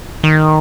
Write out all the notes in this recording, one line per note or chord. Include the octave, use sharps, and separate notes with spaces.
D#3